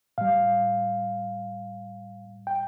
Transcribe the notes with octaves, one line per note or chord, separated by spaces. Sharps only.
A2 G3 F5
G5